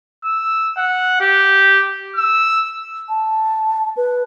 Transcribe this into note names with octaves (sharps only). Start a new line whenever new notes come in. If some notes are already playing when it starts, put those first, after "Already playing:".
E6
F#5
G4
E6
A5
B4